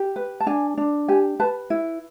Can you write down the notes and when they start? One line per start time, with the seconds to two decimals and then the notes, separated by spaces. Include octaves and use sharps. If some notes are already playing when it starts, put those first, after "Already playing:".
Already playing: G4
0.16 B4
0.40 A5
0.47 D4 G#5
0.78 D4
1.08 G4 G#5
1.40 B4 A5
1.70 E4